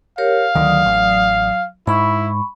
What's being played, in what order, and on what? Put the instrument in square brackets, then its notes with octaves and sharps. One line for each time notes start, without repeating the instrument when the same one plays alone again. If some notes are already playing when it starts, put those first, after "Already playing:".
[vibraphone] G4 A#4 C#5 [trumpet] F5
[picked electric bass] D2 D#3 [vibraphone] F#3 D5 D#6
[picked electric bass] A1
[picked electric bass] G#2 [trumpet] E4 [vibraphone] B5 C#6